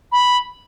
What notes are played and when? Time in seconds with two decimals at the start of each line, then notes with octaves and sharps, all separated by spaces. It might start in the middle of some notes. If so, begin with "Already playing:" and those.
0.12 B5